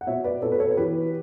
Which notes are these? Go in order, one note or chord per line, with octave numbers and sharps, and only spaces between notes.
F#5
B2 C#5 E5
B4 D5
B2 A4 C#5
B4
A4 C#5
C#5
E3 G4 B4